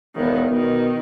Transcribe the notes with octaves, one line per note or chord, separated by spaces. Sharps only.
E1 D#3 B3
B2 D#3